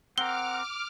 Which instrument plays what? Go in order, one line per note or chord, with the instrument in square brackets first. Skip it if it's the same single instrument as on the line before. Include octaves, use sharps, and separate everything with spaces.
[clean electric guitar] C4 A#4 [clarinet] F#5 [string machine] D6 F6 [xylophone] G7